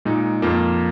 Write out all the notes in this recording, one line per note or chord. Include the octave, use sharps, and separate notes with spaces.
A#2 G#3 D#4
F2 F3 A#3